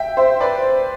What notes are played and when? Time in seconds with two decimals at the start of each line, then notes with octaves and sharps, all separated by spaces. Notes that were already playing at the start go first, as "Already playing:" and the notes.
Already playing: E5 G5
0.17 C5 E5
0.40 B4 D5